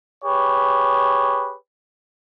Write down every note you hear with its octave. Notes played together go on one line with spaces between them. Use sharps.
G4 G#4 B4 C#5